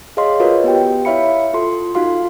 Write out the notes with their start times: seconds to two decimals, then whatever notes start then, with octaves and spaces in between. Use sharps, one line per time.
0.17 G#4 C#5 D#5 F5 C6
0.40 F4 F#4 A#4 B4 C#5 D#5
0.64 B3 G4 G5
1.05 E4 C#5 E5 F5 B5 C#7
1.54 F4 A4 C6
1.95 D#4 F4 F#4 F5 C6